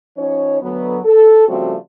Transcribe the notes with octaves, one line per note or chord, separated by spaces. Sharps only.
F3 C#4 D#4 C#5
D2 F#3 B3
A4
C#3 F3 G3 A3 C4 F#4